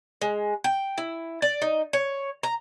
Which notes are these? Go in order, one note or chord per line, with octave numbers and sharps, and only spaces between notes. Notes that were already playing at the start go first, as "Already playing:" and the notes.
G#3
G5
E4
D5
D#4
C#5
A#5